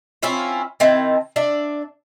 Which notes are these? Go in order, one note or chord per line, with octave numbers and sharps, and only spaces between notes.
C4 C#4 E4 F4
D#3 C4 E4 A5
D4 D5 E5